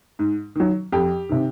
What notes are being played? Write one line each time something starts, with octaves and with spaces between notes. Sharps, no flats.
G#2
D#3 F#3
F2 G4
C3 D#3